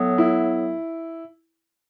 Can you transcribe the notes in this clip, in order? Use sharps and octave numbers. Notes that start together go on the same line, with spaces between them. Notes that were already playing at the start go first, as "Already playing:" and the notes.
Already playing: A2 F#3 B3
E4